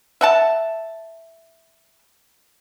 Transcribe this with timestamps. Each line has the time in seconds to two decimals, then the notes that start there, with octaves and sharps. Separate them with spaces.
0.21 E5 F#5 A5